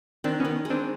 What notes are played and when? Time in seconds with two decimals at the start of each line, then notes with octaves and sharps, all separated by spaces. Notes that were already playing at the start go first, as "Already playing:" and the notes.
0.24 D#3 C4 D4
0.40 B3 C#4
0.45 D#3
0.65 G#3
0.70 C4 D4